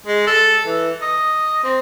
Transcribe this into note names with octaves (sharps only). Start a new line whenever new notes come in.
G#3
A4
E3
D#5
C4